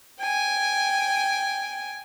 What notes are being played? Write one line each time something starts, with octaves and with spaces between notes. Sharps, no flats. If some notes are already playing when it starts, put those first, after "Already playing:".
G5 G#5